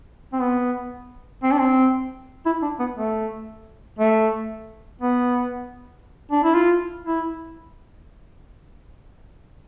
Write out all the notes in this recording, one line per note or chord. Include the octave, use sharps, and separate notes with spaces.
C4
B3
C4
D4
C4
E4
D4
B3
A3
A3
B3
D4
E4
F4
E4